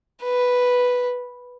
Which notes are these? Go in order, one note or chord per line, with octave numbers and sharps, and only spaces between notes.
B4